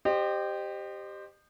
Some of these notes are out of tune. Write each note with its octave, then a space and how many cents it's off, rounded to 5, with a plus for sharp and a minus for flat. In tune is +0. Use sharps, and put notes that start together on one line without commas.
G4 +0 C5 +0 D#5 -35